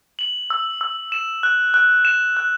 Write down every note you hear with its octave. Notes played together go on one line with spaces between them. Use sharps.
F#7
E6
E6
E7
F#6
F#6
E7
F#6